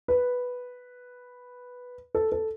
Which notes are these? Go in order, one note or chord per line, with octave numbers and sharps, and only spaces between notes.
B4
A4
A4